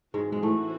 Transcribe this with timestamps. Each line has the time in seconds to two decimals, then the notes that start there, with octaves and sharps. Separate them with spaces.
0.14 G#2 E3 G#3 C4 F#4
0.32 G#3
0.42 A2 A3